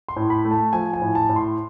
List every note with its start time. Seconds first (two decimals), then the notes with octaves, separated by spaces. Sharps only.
0.08 C6
0.16 A2
0.30 B5
0.45 A3
0.51 A5
0.73 F3 G#5
0.94 G#5
1.02 A2
1.15 A5
1.29 A2
1.36 C6